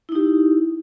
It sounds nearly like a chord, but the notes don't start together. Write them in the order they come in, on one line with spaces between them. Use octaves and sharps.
E4 D#4 G4